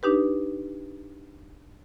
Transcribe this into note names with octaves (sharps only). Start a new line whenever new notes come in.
D4 D#4 G4 B4